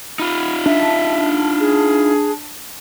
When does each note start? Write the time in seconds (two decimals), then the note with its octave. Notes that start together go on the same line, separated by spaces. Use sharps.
0.19 D#4 F4 B5
0.66 D4 E5
1.60 G#4